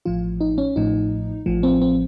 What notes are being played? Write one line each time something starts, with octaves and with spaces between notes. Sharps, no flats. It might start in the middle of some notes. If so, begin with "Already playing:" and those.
A1 A2 F3 F4
D#4
C#4
A1 A2 F3 D#4
A1 A2 F3
C4
C4